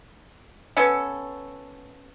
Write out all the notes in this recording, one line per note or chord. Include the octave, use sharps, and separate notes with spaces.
B3 C#4 A4